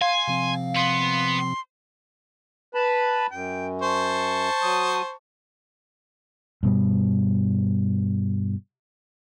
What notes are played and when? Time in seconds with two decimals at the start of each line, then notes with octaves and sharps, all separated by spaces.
0.01 F5 G#5 C6
0.28 C3 F3 C4
0.76 B3 C6
2.74 B4 A5 B5
3.31 F#2 G5
3.82 C5 A5 C#6
4.62 F#3 D#6
6.63 G2 B2 G3